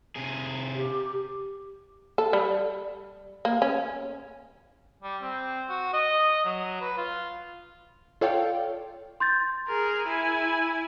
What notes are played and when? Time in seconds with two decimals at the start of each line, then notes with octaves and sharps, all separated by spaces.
0.16 C3 G#4
0.75 G4
2.18 A4
2.33 G3
3.45 A#3
3.62 C#4
5.03 G3
5.22 C4
5.69 F#4
5.93 D#5
6.45 F#3
6.81 B4
6.97 F4
8.21 F4 A4 C#5 D5 F5 G5
9.20 C6 G6 A6
9.67 G#4 A#4
10.08 E4 G#5